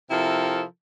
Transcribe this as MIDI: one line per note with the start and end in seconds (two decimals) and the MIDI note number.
0.11 0.63 48
0.11 0.63 53
0.11 0.63 64
0.11 0.63 69
0.11 0.63 70